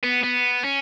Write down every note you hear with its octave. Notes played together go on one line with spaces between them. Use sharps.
B3
B3
C#4